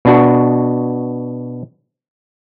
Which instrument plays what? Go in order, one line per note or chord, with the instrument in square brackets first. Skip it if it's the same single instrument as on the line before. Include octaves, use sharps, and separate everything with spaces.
[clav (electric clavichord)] B2 D4 F#4